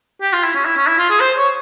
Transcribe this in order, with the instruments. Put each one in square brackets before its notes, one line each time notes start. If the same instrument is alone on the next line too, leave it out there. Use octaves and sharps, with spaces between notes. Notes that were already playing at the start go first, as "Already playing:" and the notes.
[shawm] G4
F4
E4
C#4
E4
C#4
E4
F4
G#4
C5
C#5